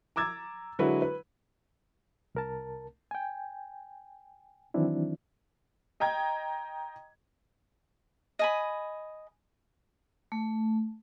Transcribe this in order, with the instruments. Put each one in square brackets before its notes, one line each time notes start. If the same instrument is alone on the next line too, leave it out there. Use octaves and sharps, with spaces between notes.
[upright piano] A#5 D6 E6 G#6 A6
D3 F#3 G#3 E4 F#4 B4
B4
[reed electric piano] C2 A#4 A5
G5 G#5
D#3 E3 F#3 C4 D4 E4
[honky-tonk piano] D#5 G5 A#5 G#6
[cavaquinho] D#5 G#5 B5
[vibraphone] A3